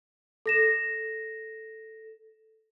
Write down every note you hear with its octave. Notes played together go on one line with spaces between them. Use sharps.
A4 A#6 E7